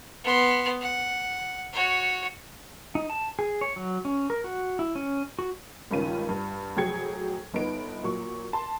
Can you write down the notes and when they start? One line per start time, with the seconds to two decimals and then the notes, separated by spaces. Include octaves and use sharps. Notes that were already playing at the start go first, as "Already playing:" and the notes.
0.24 B3 C6
0.81 F#5
1.73 F#4 C#5
2.95 D#4
3.10 A5
3.39 G#4
3.61 C#5
3.76 F#3
4.05 C#4
4.30 A#4
4.44 F#4
4.79 E4
4.95 C#4
5.39 F#4
5.91 C#2 G2 D#3 C#4 F4 D#7
6.29 G2
6.76 F1 F#3 G#4 G5 G#6 C#7
7.53 G1 B3 D#4 D7
8.03 A#2 F#3 C#6
8.53 A5 C6